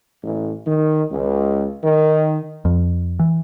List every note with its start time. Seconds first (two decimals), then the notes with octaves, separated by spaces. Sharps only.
0.23 A1
0.66 D#3
1.11 C#2
1.83 D#3
2.65 F2
3.19 E3